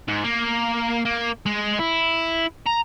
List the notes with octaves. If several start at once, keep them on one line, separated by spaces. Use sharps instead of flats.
G#2
A#3
A#3
G#3
E4
A#5